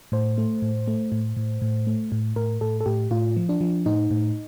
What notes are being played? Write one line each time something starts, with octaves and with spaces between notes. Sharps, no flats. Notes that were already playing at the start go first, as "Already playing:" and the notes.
A2 C5
A3
A2
A3
A2
A2
A2
A3
A2
A2 A#4
A2 A4
A4
A2 G4
A2 F4
F3
D4
F3
A2 D#4
A2